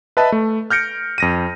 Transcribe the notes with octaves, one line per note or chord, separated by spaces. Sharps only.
B4 D#5 E5 A5 B5
A3
F6 G6 A#6 C#7 D7
F2 A#6 D#7